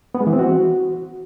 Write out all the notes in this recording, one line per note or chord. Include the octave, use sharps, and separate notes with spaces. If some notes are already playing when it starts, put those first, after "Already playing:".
B3
G#3
E3
C4
F#4